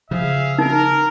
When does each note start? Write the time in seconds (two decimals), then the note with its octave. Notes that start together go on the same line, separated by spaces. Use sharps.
0.11 C#3 F3 G#4 E5 F5
0.59 D#4 A#4